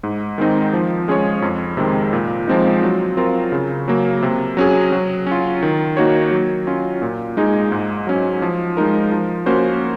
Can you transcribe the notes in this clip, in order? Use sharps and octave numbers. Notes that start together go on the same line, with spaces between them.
G#2
D#3 G#3 C4 D#4
F3
G#3 C#4 G#4 C#5
F2
C3 D#3 G#3 C4
A#2
F3 G#3 C4 D#4
F#3
C4 F4 A#4
C#3
F#3 A#3
C3
F#3 C#4 G#4
F#3
C#4 F4
D#3
A#3 D#4 F#4 C#5
F#3
C#4 F4
A#2
G#3 D#4 G#4
G#2
F#3 C#4
F3
G#3 D#4 A#4
F3
A#3 C#4 F#4 C5